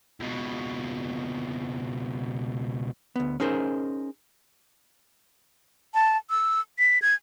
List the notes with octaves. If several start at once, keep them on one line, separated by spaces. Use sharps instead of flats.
C#2 B2
D2 B3
C#4 D#4 G#4 A#4 C5
A5
E6
B6
G#6